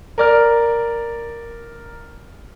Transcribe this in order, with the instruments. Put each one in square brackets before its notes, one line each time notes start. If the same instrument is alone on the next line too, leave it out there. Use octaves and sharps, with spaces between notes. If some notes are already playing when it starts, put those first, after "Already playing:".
[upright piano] A#4 D5 F6